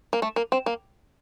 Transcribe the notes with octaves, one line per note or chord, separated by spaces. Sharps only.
A#3
A3
A#3
C4
A#3